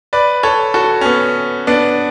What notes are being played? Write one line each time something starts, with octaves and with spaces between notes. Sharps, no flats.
B4 D5
A4 C#5
F#4 A4
C#4
B3
B3 D4